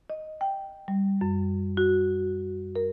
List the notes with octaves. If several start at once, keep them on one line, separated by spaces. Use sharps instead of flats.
D#5
G5
G3
F#2
F#4
A#4